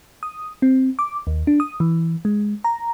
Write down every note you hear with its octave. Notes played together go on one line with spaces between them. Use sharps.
D#6
C4
D6
D#2
D4
D#6
E3
G#3
A#5